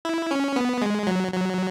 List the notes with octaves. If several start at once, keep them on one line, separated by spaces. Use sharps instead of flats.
E4
C#4
B3
G#3
F#3
F#3